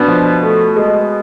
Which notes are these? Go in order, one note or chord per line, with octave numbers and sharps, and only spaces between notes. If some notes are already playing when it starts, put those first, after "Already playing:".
Already playing: B2 B3 D4
F3
A3
G#3